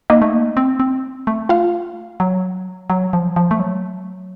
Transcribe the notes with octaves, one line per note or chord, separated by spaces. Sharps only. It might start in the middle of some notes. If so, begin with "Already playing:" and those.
A#3 D#4 D#5
A3
A#3
C4
C4
A3
F4 F5
F#3
F#3
F3
F3
A3
F#3